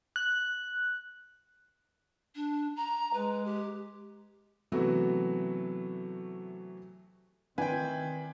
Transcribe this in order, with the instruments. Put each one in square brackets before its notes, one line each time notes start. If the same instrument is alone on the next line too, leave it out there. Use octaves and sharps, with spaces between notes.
[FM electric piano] F#6
[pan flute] D4
A#5
[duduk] G#3 [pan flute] B4
[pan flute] G4
[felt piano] C3 E3 F#3 A3 B3 F#4
[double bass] D#3 C4 [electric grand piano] B4 D5 G5 [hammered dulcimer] E5 G#5 C6